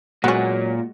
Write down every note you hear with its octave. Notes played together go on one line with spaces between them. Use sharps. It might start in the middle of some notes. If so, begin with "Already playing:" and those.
A#2 F#3 G#3 B3 C#4 F#4 F#5